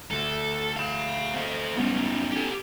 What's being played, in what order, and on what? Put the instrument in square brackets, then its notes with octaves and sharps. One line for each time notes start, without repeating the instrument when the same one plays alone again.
[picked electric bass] D2 [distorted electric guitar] A4
[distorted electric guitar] F5 B5
C4 A4
[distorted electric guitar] G2 F#3 [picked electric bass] B3 C#4
[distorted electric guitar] G4 A4